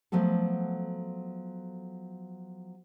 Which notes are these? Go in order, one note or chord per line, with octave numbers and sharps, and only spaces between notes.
F3 F#3 A3 B3 A4